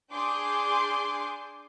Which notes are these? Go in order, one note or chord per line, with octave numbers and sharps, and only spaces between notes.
D4 G#4 C6 D6 G6